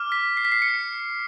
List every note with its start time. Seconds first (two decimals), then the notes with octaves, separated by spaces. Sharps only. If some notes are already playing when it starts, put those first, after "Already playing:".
Already playing: D6 F6
0.12 B6
0.37 C7
0.45 B6
0.52 C7
0.62 C#7